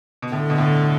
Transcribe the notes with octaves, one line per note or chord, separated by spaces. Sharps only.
B2
A2 D3
B2
A2